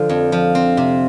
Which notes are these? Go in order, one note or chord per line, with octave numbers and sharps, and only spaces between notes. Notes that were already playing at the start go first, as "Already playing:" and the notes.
Already playing: D3 F3
F2
F3
C4
C3